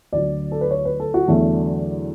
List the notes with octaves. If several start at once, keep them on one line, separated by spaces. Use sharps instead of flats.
D2 D3 F#3 D5
A4
B4
C#5
B4
A4
F#4
E2 D3 F#3 A3